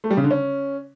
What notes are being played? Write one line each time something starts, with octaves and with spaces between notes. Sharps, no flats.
A3
G3
C#3
D3
C#4